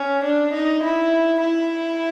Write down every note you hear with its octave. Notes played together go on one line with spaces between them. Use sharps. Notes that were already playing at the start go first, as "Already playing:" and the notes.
Already playing: C#4
D4
D#4
E4
E4